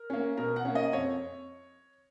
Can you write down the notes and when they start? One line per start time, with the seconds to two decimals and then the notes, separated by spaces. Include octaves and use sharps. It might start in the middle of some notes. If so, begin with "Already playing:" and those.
Already playing: A#4
0.10 A#3 C#4
0.37 B2 A#4
0.56 F#5
0.65 A#3 C#4
0.75 D#5
0.93 F2 C#5